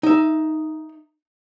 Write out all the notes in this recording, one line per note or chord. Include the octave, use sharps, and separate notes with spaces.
D#4 E5